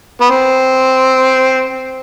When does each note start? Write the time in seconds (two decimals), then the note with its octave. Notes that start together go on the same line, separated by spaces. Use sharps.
0.21 B3
0.30 C4